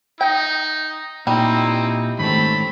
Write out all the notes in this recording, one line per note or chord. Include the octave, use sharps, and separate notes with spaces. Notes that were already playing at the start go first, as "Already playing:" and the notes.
D#4 G5
A#2 G3 C4 D#4 E4
G#2 D#3 A3 C4 C#4 A4 B5